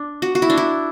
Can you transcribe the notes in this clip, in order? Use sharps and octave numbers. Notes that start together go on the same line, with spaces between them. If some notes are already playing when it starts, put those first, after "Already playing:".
Already playing: D4
F#4
F#4
E4
D4
E4